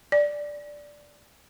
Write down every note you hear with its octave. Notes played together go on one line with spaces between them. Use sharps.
D5